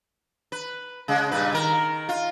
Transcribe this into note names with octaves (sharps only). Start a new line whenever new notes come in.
B4
C#3 G#3
G2 A#2 B4
D#3 A#4
F4